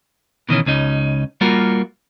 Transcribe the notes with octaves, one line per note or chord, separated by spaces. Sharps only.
B2 D#3 E3 C#4
C#2 C#4 D#4
G3 A#3 F4 F#4 A#4